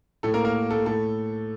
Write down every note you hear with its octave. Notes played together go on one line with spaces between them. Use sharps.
A2 A3 A4
A#3 A#4
A#3 A#4
A3 A4
A2 A3 A4